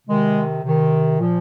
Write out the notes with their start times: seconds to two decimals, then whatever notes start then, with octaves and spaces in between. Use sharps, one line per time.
0.08 C3 D#3 G#3
0.63 C3 D#3
1.19 A#2 F3